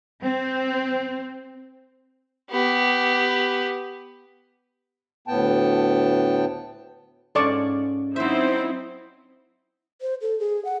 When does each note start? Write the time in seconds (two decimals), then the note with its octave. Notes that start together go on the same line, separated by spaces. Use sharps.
0.23 C4
2.51 B3 G4
5.28 D2 A2 B3 G5 A5
7.35 G#2 C#4 F4 A4 D5 C#6
8.16 F#3 C4 D#4 E4 C5 E5
10.01 C5
10.21 A4
10.40 G#4
10.65 F#5